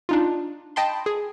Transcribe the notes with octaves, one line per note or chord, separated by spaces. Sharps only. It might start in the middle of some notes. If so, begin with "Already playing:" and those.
D4 D#4 F4
D#5 G5 A5 B5 C6
G#4